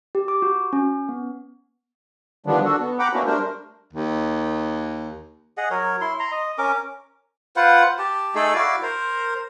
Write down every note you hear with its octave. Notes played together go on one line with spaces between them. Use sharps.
G4
D6
F#4
C#4
B3
D3 D#3 F3 G3 B3 D4
D4 F#4 A4
B3
F#5 G5 A#5 B5 D6
A#3 B3 C#4 D4 E4 F#4
G3 A3 D4 A#4 C5
D#2
G#4 D#5 F#5
F#3 A#4 C#5
E4 C6
A#5 C6
D#5
C#4 A#4 D6
F4 B4 C5 F#5
G4 A5
A3 D#4 G#4 A4
E4 F#4 D5 F5
A#4 C5